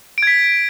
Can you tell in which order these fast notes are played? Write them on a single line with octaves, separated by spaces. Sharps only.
D7 G#6 B6